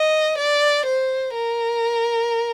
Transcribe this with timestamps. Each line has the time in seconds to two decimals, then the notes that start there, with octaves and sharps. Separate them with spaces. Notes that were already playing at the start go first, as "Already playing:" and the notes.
Already playing: D#5
0.38 D5
0.86 C5
1.35 A#4